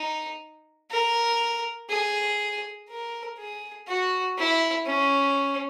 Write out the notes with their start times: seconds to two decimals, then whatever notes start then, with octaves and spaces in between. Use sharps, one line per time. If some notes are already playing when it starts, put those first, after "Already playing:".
Already playing: D#4
0.91 A#4
1.90 G#4
2.89 A#4
3.38 G#4
3.87 F#4
4.38 E4
4.86 C#4